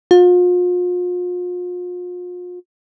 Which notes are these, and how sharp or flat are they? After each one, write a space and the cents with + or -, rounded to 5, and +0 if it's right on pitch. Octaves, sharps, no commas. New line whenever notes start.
F4 +40